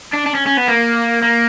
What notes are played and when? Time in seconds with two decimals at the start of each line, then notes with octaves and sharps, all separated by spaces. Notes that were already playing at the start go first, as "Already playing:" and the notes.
0.13 D4
0.26 D4
0.35 C#4
0.46 C#4
0.57 B3
0.68 A#3
1.22 A#3